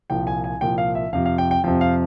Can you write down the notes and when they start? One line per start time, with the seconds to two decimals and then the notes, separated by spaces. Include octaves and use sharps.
0.10 C2 A#2 F3 G5
0.27 G#5
0.44 G#5
0.61 C2 A#2 F3 G5
0.78 F5
0.95 E5
1.13 F2 C3 F3 F5
1.26 F5
1.38 G5
1.51 G5
1.64 F2 C3 F3 G5
1.81 F5